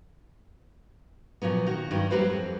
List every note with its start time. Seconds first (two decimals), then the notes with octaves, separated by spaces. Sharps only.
1.42 A#2 F3 F#3 B3
1.67 D#3 F#4
1.91 G2 D#3 F#3
2.11 F#3 G3 A#3 F#4 B4 C5
2.30 F2